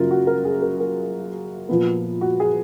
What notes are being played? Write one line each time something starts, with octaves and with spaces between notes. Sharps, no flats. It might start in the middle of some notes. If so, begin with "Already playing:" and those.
Already playing: F#2 C#3 F#3 A#3 F4 A#4
F#4
A#4
G#4
A#4
A#4
A#2 F3 B3
F#4
G#4